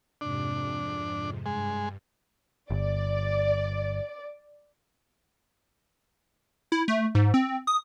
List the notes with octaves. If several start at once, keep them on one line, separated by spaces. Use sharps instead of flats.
F2 G#2 C3 D4
G2 G#3
G1 D5
E4
A3
G#2
C4
D#6